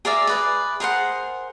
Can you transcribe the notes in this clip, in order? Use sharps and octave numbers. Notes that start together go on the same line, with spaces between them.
G#4 A#4 D5 E5
G#4 B4 D5
G#4 A#4 C5 F#5